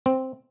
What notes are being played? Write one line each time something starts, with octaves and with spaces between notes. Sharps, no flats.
C4